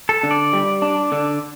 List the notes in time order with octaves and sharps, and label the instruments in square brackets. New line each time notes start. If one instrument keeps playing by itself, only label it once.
[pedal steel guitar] A4
[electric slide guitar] D3
[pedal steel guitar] D5
[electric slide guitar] G3
D4
D3